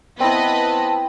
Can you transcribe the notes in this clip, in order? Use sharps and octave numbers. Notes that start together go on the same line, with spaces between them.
B3 C4 E4 B4 D#5 A5